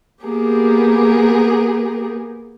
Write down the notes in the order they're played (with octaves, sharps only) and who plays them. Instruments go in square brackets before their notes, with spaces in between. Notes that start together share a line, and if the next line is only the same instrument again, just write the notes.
[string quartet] A#3 B3 G4 G#4 A#4